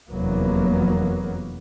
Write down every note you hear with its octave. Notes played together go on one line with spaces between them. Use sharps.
F1 E2 F#3 A#3 B3